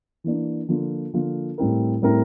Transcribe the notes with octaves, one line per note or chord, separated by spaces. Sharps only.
E3 A#3 D4
D3 F3 A#3 F4
D3 F3 A#3 F4
A2 G3 C4 E4 A#4
A2 G3 C4 E4 A#4